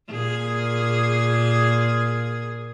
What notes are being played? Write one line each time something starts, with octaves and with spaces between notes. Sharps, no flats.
A#2 G#4